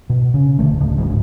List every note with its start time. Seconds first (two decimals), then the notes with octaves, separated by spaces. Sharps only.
0.10 B2
0.34 C#3
0.59 D1 D2 D3 A3
0.80 D1
0.98 D1 A#1 G#2 F#3